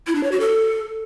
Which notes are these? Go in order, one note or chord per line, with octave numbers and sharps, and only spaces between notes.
E4
D4
C#5
F#4
A4